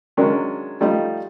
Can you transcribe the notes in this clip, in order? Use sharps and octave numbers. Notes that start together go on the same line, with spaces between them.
D#3 F#3 G#3 A#3 C#4 D4
F3 G3 A3 D#4 F4